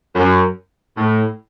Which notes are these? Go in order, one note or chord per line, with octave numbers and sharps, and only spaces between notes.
F#2
A2